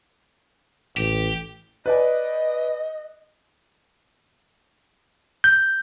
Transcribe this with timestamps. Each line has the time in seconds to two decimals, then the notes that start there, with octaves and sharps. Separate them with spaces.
0.97 A1 G4
1.86 B4 D5 D#5 G#5
5.44 G6